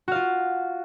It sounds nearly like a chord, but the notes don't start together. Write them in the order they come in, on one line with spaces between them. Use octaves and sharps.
F#4 F5 F4